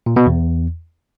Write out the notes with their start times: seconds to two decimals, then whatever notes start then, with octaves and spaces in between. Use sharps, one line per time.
0.06 A#2
0.16 B2
0.26 E2